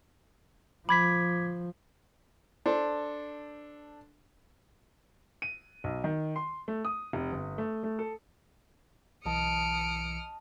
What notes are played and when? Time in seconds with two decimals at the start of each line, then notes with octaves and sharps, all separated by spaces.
0.89 F3 B5 D6 G#6 B6
2.66 D4 A4 C5
5.42 D#7
5.84 B1
6.04 D#3
6.36 C6
6.68 A3
6.85 D#6
7.13 F1
7.32 G1
7.58 A3
7.84 A3
7.99 A4
9.26 B1 E3 D#5 A5 D#6 F6 C#7 D7